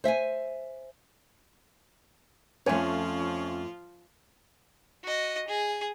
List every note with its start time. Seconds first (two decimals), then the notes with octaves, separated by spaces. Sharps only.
0.04 C5 E5 G5 G#5
2.66 F2 F3 A3 C#4 F4 C#5 G#5
5.03 F#4 D#5
5.48 G#4